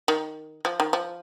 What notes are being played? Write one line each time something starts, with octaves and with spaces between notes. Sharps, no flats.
D#3
F3
D#3
F3